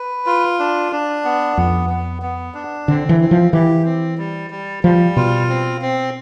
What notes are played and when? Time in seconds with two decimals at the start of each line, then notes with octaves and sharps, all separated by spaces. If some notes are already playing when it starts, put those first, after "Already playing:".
Already playing: B4
0.26 F4
0.59 D4
0.92 D4
1.24 B3
1.57 F2 B3
1.89 B3
2.22 B3
2.54 D4
2.88 D3 C4
3.09 E3
3.20 C4
3.31 F3
3.53 E3 G4
3.85 C4
4.18 G3
4.50 G3
4.83 F3 G3
5.16 B2 F4
5.49 C4
5.82 C4